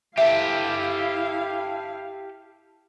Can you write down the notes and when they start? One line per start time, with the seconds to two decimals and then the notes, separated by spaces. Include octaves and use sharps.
0.18 E4 G4 A4 E5 F5